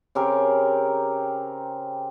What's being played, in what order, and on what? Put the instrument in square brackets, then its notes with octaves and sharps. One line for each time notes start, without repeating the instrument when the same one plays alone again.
[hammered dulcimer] C#3 C4 G4 A#4